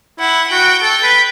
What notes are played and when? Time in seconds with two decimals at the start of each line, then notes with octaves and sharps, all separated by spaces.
0.19 E4 F#5
0.50 F#4 G5
0.82 A4 G5
1.03 B4